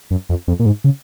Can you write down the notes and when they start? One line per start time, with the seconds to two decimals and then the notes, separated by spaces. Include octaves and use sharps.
0.11 F#2
0.29 F2
0.48 F2
0.60 A#2
0.66 G#2
0.84 C#3